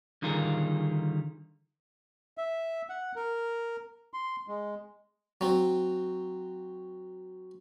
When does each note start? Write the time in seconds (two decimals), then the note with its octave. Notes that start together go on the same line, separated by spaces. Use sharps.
0.22 D3 D#3 G3 F4 G#4 A#4
2.38 E5
2.89 F#5
3.16 A#4
4.14 C6
4.48 G#3
5.41 F#3 C4